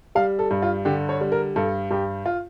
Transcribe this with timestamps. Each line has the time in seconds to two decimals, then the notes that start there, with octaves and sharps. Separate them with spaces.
0.15 G3 F5
0.39 A4
0.51 G2
0.62 F4
0.85 D3 G4
1.09 C#5
1.21 G3
1.32 A#4
1.56 G2 A4
1.91 G2 G4
2.26 F4